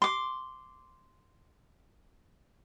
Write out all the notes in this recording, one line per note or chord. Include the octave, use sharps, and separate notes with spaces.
C6 D6